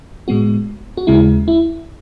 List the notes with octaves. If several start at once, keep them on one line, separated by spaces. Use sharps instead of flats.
A2 G#3 B3 F#4
F#4
D#2 C#3 G#3 E4
E4